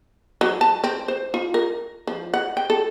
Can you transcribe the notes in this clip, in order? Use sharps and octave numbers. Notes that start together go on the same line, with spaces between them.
F#3
A5
C4
C5
F4
A#4
F3
F#5
G5
A4